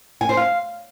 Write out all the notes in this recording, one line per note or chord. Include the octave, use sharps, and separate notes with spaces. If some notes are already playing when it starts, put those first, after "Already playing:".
G#5
C5
F5